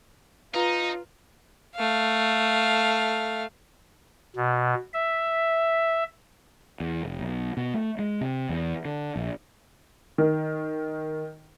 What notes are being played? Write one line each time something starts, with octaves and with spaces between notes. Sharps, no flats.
D#4 F4 B4 A#5
A3 F5
B2
E5
E2
F1
B1
B2
A3
G#3
C3
E2
D3
A#1
D#3